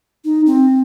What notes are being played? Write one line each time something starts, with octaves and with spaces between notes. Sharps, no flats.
D#4
C4